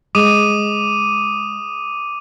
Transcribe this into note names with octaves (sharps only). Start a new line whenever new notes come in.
G#3 D6 D#6 D#7